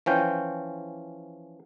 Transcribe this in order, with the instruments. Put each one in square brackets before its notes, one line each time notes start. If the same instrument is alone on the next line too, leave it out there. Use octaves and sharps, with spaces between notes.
[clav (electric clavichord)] E3 F3 C#4 G5